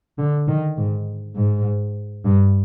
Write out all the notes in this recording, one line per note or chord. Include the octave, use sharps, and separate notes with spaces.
D3
D#3
G#2
G#2
G2